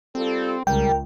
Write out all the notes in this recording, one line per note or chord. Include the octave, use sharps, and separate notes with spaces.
G3 C4 F4 A4
C#2 C#3 G3 A#4 G5